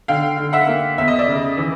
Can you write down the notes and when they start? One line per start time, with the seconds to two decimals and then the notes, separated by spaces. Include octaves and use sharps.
0.08 D3 F5 G5
0.37 D3
0.53 E5 F#5
0.67 A#3
0.98 E2 E5
1.08 D#5
1.19 D5 E5
1.28 C#3
1.57 E3